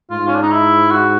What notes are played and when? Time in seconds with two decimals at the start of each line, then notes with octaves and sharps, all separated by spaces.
0.11 G#2 F4
0.27 C#4
0.35 D4
0.43 D#4
0.51 E4
0.92 F#4